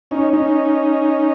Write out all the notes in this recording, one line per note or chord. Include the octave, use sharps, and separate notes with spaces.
C#4 D#4
C#4 D#4